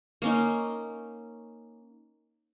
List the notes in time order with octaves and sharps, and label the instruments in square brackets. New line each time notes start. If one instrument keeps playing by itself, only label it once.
[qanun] A#3 C#4 D#4